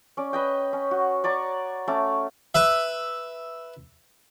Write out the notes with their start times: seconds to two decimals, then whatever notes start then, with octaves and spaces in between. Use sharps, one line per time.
0.17 C#4 D5
0.33 B4 D#5 G5
0.73 C#4
0.91 F#4
1.24 C#5 D5 A#5 C#6
1.88 A3 C#4 D6
2.55 B4 E5